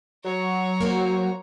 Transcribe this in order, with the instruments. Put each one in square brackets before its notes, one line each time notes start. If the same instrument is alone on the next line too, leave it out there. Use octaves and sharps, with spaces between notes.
[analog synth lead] F#3 [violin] C#5 A#5
[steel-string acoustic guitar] A#3 F#4 C5